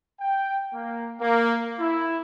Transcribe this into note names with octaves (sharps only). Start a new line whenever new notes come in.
G5
A#3
A#3
E4